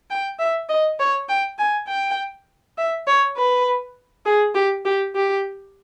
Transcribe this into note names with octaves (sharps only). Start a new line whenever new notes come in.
G5
E5
D#5
C#5
G5
G#5
G5
E5
C#5
B4
G#4
G4
G4
G4